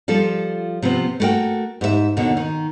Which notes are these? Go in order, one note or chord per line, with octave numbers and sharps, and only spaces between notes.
F3 G3 F4 A4
C3 F3 B3 C4
A3 C4 F#4 A#4 G5
G#2 G4 A#4 E5
D#2 B2 D3
D#3